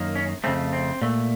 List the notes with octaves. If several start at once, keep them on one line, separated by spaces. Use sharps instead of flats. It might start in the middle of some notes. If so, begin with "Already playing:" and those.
Already playing: F#2 D#3 A#3
C#4
F2 C#3 A3 C4
C4
A#2 A3